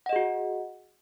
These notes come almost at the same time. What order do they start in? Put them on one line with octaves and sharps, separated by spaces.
F#5 D#5 G#4 F#4